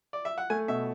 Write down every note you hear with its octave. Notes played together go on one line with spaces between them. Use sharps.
D5
E5
F#5
A3 G#5
B2 E5